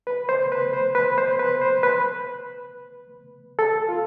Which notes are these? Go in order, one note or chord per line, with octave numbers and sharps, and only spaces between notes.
B4
C5
B4
C5
B4
C5
B4
C5
B4
A4
F4